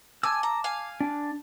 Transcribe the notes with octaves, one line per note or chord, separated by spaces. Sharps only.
G#5 A5 D6 E6
A#5
F5 G#5
D4